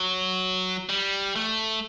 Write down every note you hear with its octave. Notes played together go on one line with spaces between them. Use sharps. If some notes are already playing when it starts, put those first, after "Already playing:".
Already playing: F#3
G3
A3